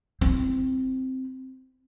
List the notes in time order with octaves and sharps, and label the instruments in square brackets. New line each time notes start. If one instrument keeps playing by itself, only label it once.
[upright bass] C4 E4